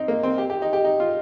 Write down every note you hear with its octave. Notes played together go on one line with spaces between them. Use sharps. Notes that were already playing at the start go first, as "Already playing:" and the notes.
Already playing: C4 D#4
A#3
C4
G4
G4
D#4
G4
D#4
F4